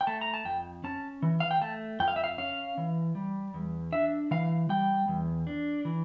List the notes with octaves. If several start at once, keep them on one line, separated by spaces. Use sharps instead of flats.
G5
A3 A5
A#5
A5
F2 G5
C#4 A5
E3
F5
G5
A3 A5
F2 G5
F5
E5
F5
C#4 F5
E3
G3
E2
D4 E5
E3 F5
G3 G5
E2
D4
E3